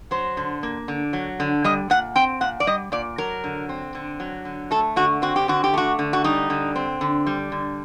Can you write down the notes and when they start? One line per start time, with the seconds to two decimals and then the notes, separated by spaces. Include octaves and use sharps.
0.11 F#3 C5
0.37 D3
0.63 A#3
0.88 D3
1.13 F#3
1.40 D3
1.64 G3 D#5
1.90 A#2 F#5
2.15 C4 G5
2.41 A#2 F#5
2.60 D5
2.67 G3 D#5
2.92 A#2 D5
3.18 F#3 A#4
3.44 D3
3.69 C4
3.95 D3
4.20 F#3
4.45 D3
4.71 A3 A4
4.96 D3 F#4
5.22 C4 F#4
5.36 G4
5.48 D3 F#4
5.64 G4
5.73 A3 F#4
5.99 D3
6.13 F#4
6.24 G3 D#4
6.50 D3
6.76 C4
7.01 D3
7.27 G3
7.52 D3